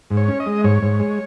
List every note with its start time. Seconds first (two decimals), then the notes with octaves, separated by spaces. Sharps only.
0.10 G#2
0.17 C#5
0.28 C#4
0.40 D#5
0.46 G#3
0.64 G#2 C#5
0.82 G#2
0.99 G#3